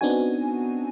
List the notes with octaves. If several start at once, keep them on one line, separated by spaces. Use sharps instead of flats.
B3 C4 D4 D#4 F#4 G#5